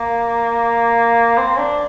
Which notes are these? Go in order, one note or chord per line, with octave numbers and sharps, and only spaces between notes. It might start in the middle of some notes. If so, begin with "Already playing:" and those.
Already playing: A#3
C4
D4